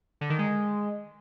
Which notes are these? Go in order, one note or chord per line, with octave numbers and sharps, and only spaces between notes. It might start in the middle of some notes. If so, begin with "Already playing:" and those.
D3
D#3
G#3